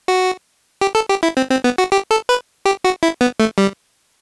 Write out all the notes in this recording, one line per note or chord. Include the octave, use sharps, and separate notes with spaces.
F#4
G4
A4
G4
E4
C4
C4
B3
F#4
G4
A4
B4
G4
F#4
E4
B3
A3
G3